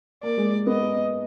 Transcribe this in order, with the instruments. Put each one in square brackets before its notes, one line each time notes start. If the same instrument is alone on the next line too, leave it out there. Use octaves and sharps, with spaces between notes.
[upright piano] A#3 [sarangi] D5
[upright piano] G#3
[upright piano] B3 [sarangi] D#5